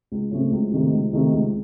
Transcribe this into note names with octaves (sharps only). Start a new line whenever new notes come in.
C#2
C#3 F#3 A3 C4
C#2
C3 D#3 A3 C4
C#2
C3 D#3 A3 C4
C#2